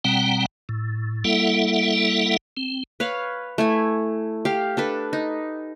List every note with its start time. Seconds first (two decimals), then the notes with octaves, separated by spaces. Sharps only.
0.04 B2 G3 C4 F#5 G5 A#5
0.69 A2
1.25 G3 A#3 E4 A4 E5 F#5
2.57 C4
3.00 B4 C#5 F5
3.58 A3 E4 G#5
4.45 G4 F5
4.77 D4 A4 B4
5.13 D#4